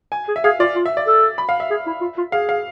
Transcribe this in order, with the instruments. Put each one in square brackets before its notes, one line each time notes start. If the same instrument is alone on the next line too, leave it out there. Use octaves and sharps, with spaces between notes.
[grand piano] G#5
[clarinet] G#4
[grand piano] E5
[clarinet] G#4 [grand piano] F5
[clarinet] F4 [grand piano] D5
[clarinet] F4
[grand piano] E5
D5
[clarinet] A4
[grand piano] B5
F5
E5
[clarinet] G#4
E4
F4
F4
[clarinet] G#4 [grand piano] F5
[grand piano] F5